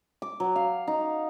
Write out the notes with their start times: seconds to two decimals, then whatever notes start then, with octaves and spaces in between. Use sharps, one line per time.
0.22 D6
0.40 F#3
0.56 F5
0.87 D#4